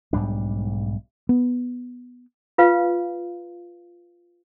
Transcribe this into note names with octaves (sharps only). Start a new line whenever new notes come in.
B1 G#2 G3 D4
B3
F4 B4 F5